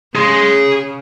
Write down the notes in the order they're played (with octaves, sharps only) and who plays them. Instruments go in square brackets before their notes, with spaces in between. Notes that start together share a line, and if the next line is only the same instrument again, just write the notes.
[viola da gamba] C#3 [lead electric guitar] G#4 C6